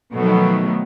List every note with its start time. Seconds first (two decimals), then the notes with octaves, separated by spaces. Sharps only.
0.14 B2 D#3 F3 F#3 A3 B3